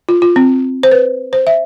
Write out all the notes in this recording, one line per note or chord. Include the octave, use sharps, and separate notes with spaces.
F4
F4
C4
C5
B4
C5
E5